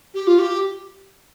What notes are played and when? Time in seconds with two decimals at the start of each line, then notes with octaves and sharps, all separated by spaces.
0.14 G4
0.27 F4
0.38 G4